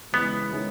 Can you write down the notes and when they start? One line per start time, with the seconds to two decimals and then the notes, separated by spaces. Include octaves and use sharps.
0.13 C#3 E3 G#3 B3
0.52 D#3 G#3 C#4 E4